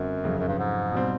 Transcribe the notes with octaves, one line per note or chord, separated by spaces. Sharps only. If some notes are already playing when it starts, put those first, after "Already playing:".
Already playing: F#2 D3 G3 C4 D#4 F#4
F2 C#3 F#3
F#2
G2
G#2
B2 G3 C4